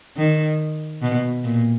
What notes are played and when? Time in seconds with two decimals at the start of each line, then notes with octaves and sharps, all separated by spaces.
0.17 D#3
1.02 B2
1.44 A#2